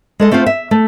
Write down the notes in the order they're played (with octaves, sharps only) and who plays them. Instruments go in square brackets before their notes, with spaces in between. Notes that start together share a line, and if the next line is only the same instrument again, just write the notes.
[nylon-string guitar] G#3 A4 D#5
A3 C4 F4 C5 F5
E5
A3